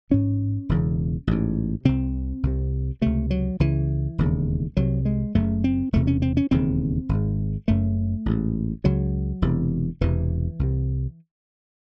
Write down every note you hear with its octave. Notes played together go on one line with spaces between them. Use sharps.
A1 G#2 C#4
E1 E2 C#3
A1 G#2
C2 C3 C4
C2 C3
C#2 C3 A3
F#3
C#2 C#3 E3
E1 D#2 C#3
C2 C3 F#3
G#3
F#1 F#2 C#3 A3
C4
E1 E2 C3 A3
C#4
C4
C#4
E1 D#2 C#3 C4
G#1
G#2
F#1 F#2 C#3 A3
A1 G#2
C#2 C#3 F#3
E1 E2 C3
E1 E2 C3 E3
C2 C3